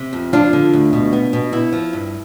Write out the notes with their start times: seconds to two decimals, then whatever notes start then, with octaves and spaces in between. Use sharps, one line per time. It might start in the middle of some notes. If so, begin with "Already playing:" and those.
Already playing: C3
0.13 F2
0.33 F3 D4 F4
0.53 D3
0.73 D2
0.93 B2
1.13 B3
1.33 B2
1.53 B3 E4
1.72 F3
1.93 G2